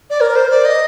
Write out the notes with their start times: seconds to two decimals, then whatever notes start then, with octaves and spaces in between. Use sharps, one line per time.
0.09 D5
0.20 A#4
0.35 C5
0.50 D5
0.65 D#5